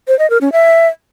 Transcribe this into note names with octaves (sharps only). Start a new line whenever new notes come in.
C5
D#5
A#4
C#4
E5